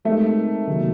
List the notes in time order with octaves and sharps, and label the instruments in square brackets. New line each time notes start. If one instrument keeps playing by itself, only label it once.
[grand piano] G#3 C4 D#4 G4 A#4 [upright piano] A3
[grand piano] C3 D#3 F#3 A#3